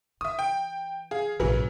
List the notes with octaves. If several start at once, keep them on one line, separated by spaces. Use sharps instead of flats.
E3 E5 D#6
G5
G#4 F5
A#1 G#2 C#3 E3 F#3